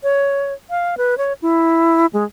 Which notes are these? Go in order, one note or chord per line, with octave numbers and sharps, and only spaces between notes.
C#5
F5
B4
C#5
E4
G#3